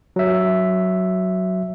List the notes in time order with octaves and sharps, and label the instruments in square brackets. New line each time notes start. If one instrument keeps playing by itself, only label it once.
[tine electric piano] F#3 E5